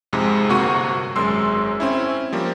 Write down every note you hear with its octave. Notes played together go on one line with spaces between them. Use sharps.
F2 G#2 C3 G#3
G1 C3 A#3 F#4 C#6 D#7
G#1 F#2 G#3 C6 E6
C4 C#4 E4
F3 G3 A#3